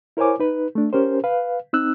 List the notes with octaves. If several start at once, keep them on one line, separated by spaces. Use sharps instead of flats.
E4 A#4 C5 C#5 G#5 D6
D#4 B4
A3 D4
C#4 G4 A#4 C5
B4 F5
C4 D#4 E6 F#6